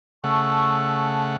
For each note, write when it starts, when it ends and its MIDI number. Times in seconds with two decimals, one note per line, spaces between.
0.24 1.37 49
0.24 1.37 57
0.24 1.37 78
0.24 1.21 81
0.24 1.21 85
0.24 1.07 88